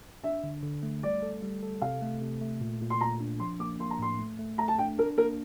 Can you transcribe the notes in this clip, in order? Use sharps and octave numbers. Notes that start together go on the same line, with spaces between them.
D4 E5
D3
D3
A3
G3 D5
A4
G3
A4
C3 F5
A3
C3
A3
A#2
A#2
C6
A#2 A#5
D4
F3 C6
A#3 D6
A#3 C6
A#5
A2 C6
A3
A3
A3 A#5
A5
D4 G5
D4 A#4
A#3 A#4